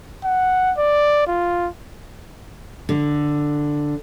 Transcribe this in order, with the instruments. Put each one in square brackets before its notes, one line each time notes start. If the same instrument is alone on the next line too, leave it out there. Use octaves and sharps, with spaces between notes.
[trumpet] F#5
D5
F4
[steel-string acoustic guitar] D3